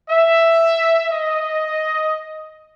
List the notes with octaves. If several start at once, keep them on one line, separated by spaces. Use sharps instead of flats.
E5
D#5